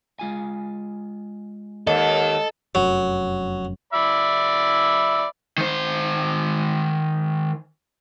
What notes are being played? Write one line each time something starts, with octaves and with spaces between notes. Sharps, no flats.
G#3 F4 G#5
D#2 A4 D#5
F1 F#2 F#3
D5 E5 B5
D#3 C5